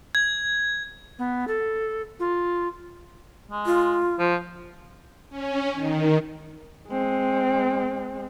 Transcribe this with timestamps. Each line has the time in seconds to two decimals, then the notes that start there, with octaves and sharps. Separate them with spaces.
0.15 G#6
1.19 B3
1.48 A4
2.20 F4
3.51 G#3
3.66 F4
4.19 F3
5.30 C#4
5.73 D#3
6.89 G#3 C4